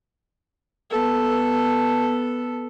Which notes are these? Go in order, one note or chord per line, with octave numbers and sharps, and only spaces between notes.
B3 A4